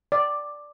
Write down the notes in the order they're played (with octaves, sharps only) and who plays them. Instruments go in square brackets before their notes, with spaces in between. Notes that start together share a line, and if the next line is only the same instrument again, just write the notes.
[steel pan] D5